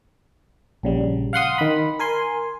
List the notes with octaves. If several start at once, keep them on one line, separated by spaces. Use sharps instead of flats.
A#1 C#3 G3
F5 F#5 C6 D#6
D#3 B5
A#4 G#5 C6